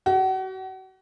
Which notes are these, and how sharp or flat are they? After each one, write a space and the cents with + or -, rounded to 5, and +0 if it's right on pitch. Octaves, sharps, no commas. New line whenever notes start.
F#4 +35